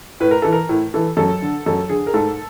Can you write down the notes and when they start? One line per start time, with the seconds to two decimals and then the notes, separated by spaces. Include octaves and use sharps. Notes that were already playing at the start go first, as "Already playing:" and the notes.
0.20 A2 B4
0.31 A#4
0.42 E3 A4
0.53 A#4
0.69 A2
0.94 E3 A4
1.17 F#2 A4
1.42 D3
1.66 F#2 A4
1.89 D3 G#4
2.07 A#4
2.14 G#2 A4